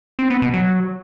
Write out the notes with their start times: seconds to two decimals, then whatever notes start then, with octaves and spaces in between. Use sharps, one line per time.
0.19 C4
0.30 B3
0.42 B2
0.54 F#3